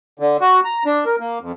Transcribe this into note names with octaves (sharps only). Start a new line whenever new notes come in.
D3
F#4
A#5
D4
A#4
A#3
F2